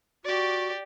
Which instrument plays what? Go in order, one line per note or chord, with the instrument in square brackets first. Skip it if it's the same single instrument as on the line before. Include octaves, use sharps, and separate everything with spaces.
[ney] F#4 [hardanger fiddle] G4 D5